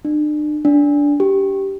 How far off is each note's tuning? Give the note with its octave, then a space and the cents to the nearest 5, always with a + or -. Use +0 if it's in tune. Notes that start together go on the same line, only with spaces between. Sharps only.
D4 +40
D4 -15
G4 -5